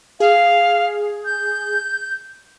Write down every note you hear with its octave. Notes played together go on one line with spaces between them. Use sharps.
G#4 F5
G6